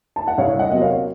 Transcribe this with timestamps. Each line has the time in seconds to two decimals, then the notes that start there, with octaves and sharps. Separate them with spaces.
0.16 A5
0.27 F#5
0.38 C2 C#5 F5
0.59 D#5 F#5
0.71 C3 F#3 A#3 D#5
0.81 C#5 F5